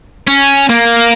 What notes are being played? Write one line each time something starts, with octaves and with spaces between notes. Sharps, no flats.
C#4
A#3